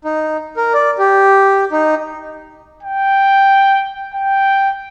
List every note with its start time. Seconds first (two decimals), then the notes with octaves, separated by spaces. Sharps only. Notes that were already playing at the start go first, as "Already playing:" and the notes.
0.05 D#4
0.57 A#4
0.74 D5
0.99 G4
1.72 D#4
2.83 G5
4.15 G5